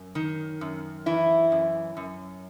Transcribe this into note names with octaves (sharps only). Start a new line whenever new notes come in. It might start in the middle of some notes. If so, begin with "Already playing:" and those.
Already playing: F#2
D#3
F#2
E3 E4
F#2
F#2